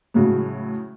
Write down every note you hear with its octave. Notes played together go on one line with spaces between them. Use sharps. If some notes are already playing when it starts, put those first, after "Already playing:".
A2 C#3 F#3 G#3